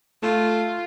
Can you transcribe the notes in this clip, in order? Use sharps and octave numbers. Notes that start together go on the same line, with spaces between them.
A3 F4